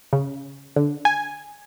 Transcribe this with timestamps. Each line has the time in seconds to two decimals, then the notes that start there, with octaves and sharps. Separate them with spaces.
0.13 C#3
0.76 D3
1.05 G#5